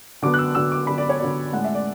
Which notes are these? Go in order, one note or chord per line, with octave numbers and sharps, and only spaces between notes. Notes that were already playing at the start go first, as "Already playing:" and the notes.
D3 F#3 B3 D6
F#6
E6
D3 F#3 B3 E6
D6
D3 F#3 B3 B5
D5
C#5
D3 F#3 B3 D5
A2 G#3 C#4 F#5
E5
D5